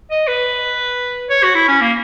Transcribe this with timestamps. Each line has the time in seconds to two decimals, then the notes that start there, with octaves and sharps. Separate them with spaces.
0.11 D#5
0.28 B4
1.30 C#5
1.43 F#4
1.55 E4
1.68 C#4
1.81 A#3